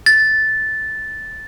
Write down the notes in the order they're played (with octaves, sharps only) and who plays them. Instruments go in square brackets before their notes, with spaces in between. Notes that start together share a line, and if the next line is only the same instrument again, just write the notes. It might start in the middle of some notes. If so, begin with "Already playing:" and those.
[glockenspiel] A6